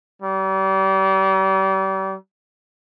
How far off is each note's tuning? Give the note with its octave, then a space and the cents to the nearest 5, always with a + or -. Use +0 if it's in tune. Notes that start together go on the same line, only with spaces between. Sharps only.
G3 -35